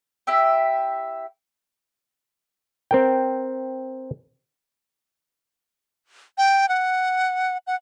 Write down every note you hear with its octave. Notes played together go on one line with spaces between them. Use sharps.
E4 G4 E5 G5
C4 A#4 G5
G5
F#5
F#5